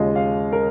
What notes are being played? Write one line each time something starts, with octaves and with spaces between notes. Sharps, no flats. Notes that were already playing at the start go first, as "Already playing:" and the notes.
Already playing: D#2 C#3 G#3 F4 D#5
F5
A#4